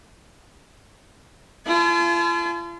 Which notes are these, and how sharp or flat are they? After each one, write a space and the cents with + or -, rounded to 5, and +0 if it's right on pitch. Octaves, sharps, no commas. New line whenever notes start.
F4 -40 A5 -45